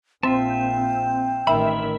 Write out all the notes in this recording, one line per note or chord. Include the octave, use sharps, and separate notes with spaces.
A#1 C4 F4 E5 G5 A5
A1 D#3 A#4 C5 E5 B5